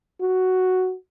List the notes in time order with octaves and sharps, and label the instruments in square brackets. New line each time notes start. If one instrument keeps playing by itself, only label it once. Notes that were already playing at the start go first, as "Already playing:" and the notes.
[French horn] F#4